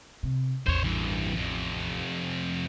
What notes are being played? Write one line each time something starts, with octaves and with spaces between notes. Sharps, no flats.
C3
A1 E2 C5 C#5
G2 E3
F2 C3